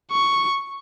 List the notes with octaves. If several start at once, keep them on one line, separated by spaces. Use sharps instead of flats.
C#6